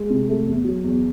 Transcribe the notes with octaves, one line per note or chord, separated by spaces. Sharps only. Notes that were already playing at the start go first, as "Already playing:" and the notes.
Already playing: G#3
C3
A3
E2
F#3
E2